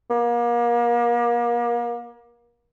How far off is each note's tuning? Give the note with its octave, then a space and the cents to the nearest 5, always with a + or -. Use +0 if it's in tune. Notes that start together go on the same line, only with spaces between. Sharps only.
A#3 +35